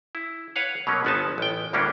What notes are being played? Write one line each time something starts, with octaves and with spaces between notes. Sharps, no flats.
E4
B4 C#5 F5 F#5
B2 F#3 A#3 C#4
G1 F3 B3 D#4 G#5 A5
A1 G5
D2 A2 G3 A#3 C#4 D4